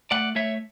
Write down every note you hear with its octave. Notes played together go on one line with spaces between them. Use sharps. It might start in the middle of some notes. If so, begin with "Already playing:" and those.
A3 D5 F#5
A3 C#5 E5